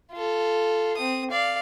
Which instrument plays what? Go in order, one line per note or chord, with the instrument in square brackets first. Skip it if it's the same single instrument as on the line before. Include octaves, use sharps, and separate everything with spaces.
[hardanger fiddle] F4 A4
C4 D#6
D5 F5